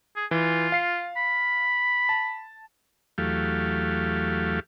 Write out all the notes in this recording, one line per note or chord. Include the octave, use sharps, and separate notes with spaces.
G#4
E3 F4
F5 C7
B5
A5
E2 F#3 A3 G4 F5